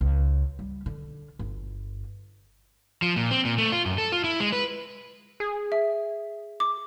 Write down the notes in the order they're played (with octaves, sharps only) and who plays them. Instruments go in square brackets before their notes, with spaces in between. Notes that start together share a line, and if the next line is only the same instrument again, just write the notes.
[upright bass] C#2
G3
D3
G1
[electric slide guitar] F3
A#2
C4
A#2
A3
F4
F#2
A4
F4
E4
G#3
B4
[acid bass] G#4
[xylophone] E5
D6